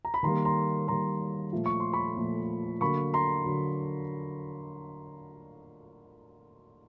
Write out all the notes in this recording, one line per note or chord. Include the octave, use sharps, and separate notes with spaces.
A#5
B5
D#3 G3 A#3 A#5 C6
A#5 C6
D#3 G3 A#3 A#5 C6
A#2 F3 A3
C#6
C6
B5 C#6
A#2 F3 A3
D3 F#3 A#3 B5 C#6
A#5 C6
D3 F#3